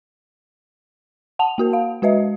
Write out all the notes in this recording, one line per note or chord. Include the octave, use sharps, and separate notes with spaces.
F#5 A5 F7
A#3 F#4 A#4
F5
G#3 F#4 B4 D#5 E5